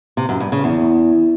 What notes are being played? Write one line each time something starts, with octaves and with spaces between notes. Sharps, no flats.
C3
F#2
G2
C#3
E2